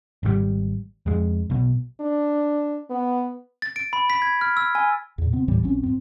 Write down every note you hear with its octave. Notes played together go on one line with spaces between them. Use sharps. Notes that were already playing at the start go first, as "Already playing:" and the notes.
G#1 C#3 G3
F2 G#3
B1 B2
D4
B3
A6
D7
B5
B6
G#6
F6
E6
G#5
E2 A#2
C3 B3 C4
D#2 A2 E3 G3
A#1 F#3 C4 C#4
G2 C4